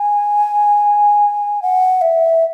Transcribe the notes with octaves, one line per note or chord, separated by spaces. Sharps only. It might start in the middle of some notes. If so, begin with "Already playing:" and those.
Already playing: G#5
F#5
E5